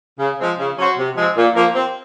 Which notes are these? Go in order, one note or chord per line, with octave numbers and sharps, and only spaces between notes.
C#3
F3 G#3 C4
C#3
F#3 C#4 F#4 C5
C3
F3 G#3 C4
A#2
F3 A#3
C4